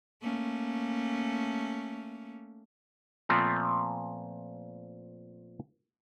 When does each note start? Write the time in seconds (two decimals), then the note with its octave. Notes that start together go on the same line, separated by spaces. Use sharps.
0.22 A3 A#3 C#4
3.29 A#2 F3 A3 B3 C4